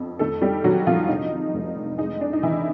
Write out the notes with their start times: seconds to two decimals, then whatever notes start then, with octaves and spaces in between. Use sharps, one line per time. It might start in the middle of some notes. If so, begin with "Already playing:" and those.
Already playing: F2 B3
0.19 D#3 A3 A4
0.41 G3 G4
0.64 D#3 F#3 F#4
0.87 F3 F4
1.09 C3 D#4
1.54 F1
1.98 G#3 D#4
2.21 D4
2.33 D#4
2.42 D#3 E3 E4